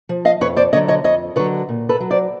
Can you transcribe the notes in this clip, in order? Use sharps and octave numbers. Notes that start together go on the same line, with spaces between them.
F3
D#5 F5
F2 B4 C#5
C5 D5
D3 F#3 C#5 D#5
C#5 D#5
F2 C#5 D#5
D3 F#3 B4 C#5
A#2
A4 B4
F#3
C5 D5